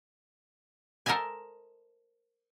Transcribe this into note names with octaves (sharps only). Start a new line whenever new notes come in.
A4 A#4 C5 D#5 E5 G#5